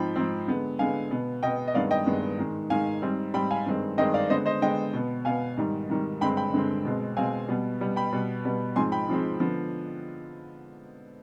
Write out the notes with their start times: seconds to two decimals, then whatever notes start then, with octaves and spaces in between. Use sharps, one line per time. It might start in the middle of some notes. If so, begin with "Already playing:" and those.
Already playing: G#2 F3 C4 G5 B5
0.16 G#2 F3 C4
0.47 D3 G#3 B3
0.79 D3 G#3 B3 F5 G#5
1.11 B2 B3
1.43 B2 B3 D#5 G5
1.68 D#5
1.74 G2 D#3 G#3 B3 D5 F5
1.91 D#5 G5
2.06 G2 D#3 G#3 B3
2.38 G#2 D#3 G#3
2.70 G#2 D#3 G#3 F5 G#5
3.02 G#2 G3 C4
3.34 G#2 G3 C4 G5 B5
3.51 F5 G#5
3.66 G2 D#3 G#3 C4
3.98 G2 D#3 G#3 C4 D#5 G5
4.14 D5 F5
4.30 D3 G#3 B3 C5 D#5
4.46 C5 D#5
4.62 D3 G#3 B3 D#5 G5
4.93 B2 B3
5.25 B2 B3 F5 G#5
5.57 G#2 D#3 G3
5.90 G#2 D#3 G3
6.21 G2 D3 G#3 C4 G5 B5
6.37 G5 B5
6.53 G2 D3 G#3 C4
6.85 B2 G#3 C4
7.17 B2 G#3 C4 F5 G#5
7.48 B2 G3 B3
7.81 B2 G3 B3
7.96 G5 B5
8.13 B2 G3 B3
8.45 B2 G3 B3
8.76 G#2 F3 G#3 C4 G#5 C6
8.92 G5 B5
9.08 G#2 F3 G#3 C4
9.40 D3 F3 B3